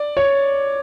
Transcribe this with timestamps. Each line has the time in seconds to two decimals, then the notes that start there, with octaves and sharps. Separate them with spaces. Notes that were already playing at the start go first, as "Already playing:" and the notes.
Already playing: D5
0.17 C#5